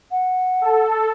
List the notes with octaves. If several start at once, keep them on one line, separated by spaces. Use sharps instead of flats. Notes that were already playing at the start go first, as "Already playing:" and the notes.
F#5
A4